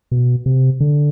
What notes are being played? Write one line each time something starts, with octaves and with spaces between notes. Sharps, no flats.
B2
C3
D3